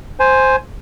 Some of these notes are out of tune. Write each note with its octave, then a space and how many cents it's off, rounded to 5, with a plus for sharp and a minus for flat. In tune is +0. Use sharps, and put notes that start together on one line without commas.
C5 +0 G#5 +0